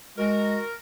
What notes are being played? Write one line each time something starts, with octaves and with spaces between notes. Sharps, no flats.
G#3 F#4 A#4